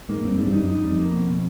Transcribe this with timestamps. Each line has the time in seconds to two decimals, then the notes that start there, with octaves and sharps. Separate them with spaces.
0.09 G#2 A#3
0.24 G2 C4
0.38 G#2 G3
0.47 G2
0.53 F#2 D#4
0.68 D#4
0.83 F2 G3
0.99 A#3
1.14 B2
1.28 B2